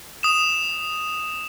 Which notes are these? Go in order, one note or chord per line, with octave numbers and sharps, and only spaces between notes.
D#6 E7